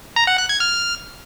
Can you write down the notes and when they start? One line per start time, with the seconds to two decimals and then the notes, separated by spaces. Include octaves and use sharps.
0.16 A#5
0.27 F#5
0.38 F#6
0.49 G#6
0.60 F6